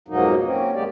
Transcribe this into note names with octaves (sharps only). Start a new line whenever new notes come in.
F2 G#2 B2 F#3 A#3 D#4
A#3 C4 C#4
F#2 F#3 G#3 A#3 G4 D5